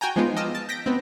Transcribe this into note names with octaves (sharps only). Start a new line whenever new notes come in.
F#4 G5 G#5 A#5
F3 G#3 B3 D#4 F4
D#5 A5 D6 E6 F6
A5
G6 A#6 B6 D7
B3 C4